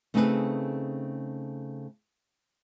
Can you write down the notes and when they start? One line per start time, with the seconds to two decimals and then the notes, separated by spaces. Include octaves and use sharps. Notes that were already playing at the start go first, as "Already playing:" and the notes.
0.14 C#3 A3 C4 D#4 G#4 B4